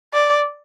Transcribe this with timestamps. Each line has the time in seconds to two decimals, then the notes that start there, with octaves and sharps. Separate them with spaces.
0.14 D5